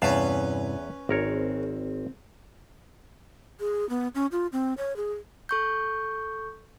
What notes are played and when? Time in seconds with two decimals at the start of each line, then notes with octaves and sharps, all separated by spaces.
0.02 E2 G2 C3 E3 C#4 B4 F5 A5
1.09 G#1 C4 A#4 C#5
3.60 G#4
3.90 B3
4.15 C#4
4.32 F4
4.52 C4
4.78 C#5
4.96 G#4
5.49 A4 C#6 G6